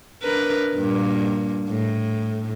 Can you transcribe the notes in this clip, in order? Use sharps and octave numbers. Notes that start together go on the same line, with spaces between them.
D4 A#4 B4
G2 A#2 A#3
A2